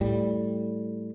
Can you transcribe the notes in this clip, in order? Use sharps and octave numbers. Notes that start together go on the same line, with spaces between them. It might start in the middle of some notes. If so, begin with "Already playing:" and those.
A2 G3